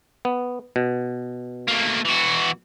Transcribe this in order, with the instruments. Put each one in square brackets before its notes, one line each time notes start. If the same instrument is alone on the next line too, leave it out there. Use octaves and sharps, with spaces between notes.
[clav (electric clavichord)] B3
B2
[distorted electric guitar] A3 A#3
E3 F#4